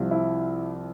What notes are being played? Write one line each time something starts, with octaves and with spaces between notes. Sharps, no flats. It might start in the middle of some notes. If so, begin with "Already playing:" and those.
Already playing: C2 C3 F3
E4